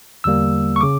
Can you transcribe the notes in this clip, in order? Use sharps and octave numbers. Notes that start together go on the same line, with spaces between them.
E2 D3 G3 A#3 E6
C#6
C#3 D6